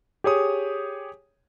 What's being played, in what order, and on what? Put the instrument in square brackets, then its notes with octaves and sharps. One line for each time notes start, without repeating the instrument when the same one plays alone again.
[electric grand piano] G4 G#4 C#5 D#6